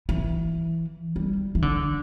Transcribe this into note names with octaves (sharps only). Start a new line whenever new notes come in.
E3
G3
E3
D3